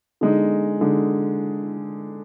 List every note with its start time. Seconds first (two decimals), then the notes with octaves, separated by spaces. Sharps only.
0.21 D3 G#3 D#4
0.81 D3 G#3 D#4